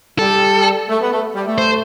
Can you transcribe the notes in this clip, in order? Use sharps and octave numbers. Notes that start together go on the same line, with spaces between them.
G3 A4
A3
B3
A3
G3
A3
C5